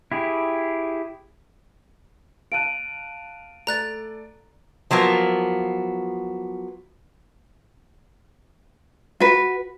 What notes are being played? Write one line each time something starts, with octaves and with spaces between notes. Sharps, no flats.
E4 G4 G#4
F5 A5 F#6 D7 D#7
A3 A4 D5 A#5 F#6 A6
F3 F#3 A#3 B3
F#4 B4